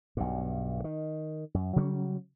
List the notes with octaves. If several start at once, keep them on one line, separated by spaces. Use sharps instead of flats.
B1 G2
D#3
F#2
C#3 F#3 G3 C#4